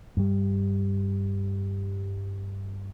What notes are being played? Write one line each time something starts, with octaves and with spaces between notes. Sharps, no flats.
G2 G3